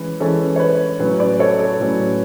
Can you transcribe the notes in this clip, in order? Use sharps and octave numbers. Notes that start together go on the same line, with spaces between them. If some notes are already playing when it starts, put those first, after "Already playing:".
Already playing: E3 G#3 C#4 B4
E3 G#3 C#4 A4
C#5
B4
A2 F#3 C#4 B4
B4 D5
A4 C#5
A4
A2 F#3 C#4